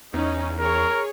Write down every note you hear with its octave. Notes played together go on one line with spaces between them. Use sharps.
E2 C#4 D#4
G#4 A#4 C#5